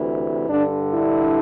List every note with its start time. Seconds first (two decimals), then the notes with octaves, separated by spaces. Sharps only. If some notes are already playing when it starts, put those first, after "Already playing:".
Already playing: D2 C3 E3
0.49 G2 D3 D4
0.93 E4